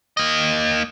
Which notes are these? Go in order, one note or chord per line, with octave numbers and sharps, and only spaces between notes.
A#3 D#5